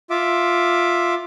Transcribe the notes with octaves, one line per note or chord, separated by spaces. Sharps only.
F4 E5 D6